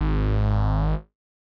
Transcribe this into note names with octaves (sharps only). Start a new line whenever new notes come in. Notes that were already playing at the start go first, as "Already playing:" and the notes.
G#1